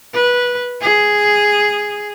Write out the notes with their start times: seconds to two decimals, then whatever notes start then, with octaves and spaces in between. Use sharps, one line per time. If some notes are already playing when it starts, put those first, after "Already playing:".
0.14 B4
0.81 G#4